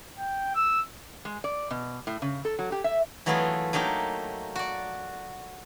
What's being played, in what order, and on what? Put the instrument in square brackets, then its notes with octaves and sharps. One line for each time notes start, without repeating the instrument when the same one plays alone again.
[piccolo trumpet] G5
E6
[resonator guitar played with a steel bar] G#3
D5
B2
A2
C#3
A4
F#3
G4
E5
[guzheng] E3 F#3 A3 B3 F4 G#4
F#3 A3 A#3 D#4 G4
F#4 D5